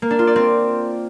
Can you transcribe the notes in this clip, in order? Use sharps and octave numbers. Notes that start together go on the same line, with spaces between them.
A#3
D4
F4
D5
C4